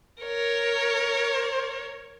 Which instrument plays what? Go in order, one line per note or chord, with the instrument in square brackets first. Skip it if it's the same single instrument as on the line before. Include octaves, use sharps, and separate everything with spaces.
[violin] A#4 C#5